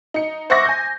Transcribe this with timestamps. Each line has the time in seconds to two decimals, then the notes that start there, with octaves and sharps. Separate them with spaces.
0.14 D#4 C#7
0.50 C5 E5 F#5 C#6 D6 A#6
0.65 G#5 G6